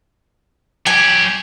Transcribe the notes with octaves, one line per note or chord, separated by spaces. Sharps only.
F#3 G4 G#5